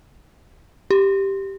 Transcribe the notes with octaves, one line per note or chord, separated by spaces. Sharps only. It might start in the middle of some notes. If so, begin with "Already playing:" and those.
G4